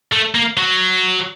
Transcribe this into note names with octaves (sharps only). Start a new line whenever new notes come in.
A3
A#3
F#3